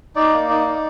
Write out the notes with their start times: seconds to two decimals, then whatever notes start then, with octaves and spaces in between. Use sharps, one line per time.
0.16 D#4 D5
0.33 A#3
0.50 D#4
0.67 D#4